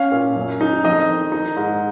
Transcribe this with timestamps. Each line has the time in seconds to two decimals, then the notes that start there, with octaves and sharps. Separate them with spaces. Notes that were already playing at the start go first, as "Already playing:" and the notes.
Already playing: C#4 F5
0.12 A#2
0.36 F#2
0.61 D#4
0.84 F2 D#5
1.08 D#3
1.32 D#4
1.57 G#2